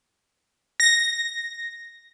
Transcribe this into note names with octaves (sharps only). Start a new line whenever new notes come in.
A#6